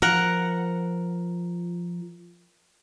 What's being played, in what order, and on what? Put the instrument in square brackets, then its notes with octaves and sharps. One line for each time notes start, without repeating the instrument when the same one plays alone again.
[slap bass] F3 [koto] A#4 F#5